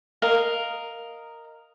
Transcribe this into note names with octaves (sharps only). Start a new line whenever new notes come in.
A#4 D#5 F5